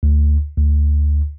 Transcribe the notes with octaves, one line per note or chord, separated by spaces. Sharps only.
D2
D2